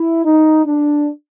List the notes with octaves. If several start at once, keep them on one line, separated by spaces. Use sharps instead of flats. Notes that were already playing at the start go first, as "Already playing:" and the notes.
Already playing: E4
D#4
D4